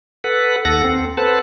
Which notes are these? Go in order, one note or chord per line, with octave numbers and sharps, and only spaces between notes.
A4 B4 F#5
D#2 A4 F#5 A#6
C4
A4 B4 C5 F#5 A5